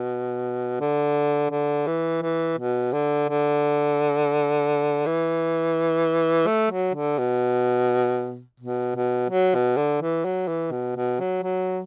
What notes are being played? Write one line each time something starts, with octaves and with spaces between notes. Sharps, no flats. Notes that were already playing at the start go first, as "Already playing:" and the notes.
Already playing: B2
D3
D3
E3
E3
B2
D3
D3
E3
A3
F#3
D3
B2
B2
B2
F#3
B2
D3
E3
F#3
E3
B2
B2
F#3
F#3